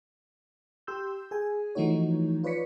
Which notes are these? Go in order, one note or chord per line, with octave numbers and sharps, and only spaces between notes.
G4 C6 E6 G6
G#4 G#5
E3 F3 A3 D#4 F#4 C#5
F4 B4 C#5 D5 B6 C#7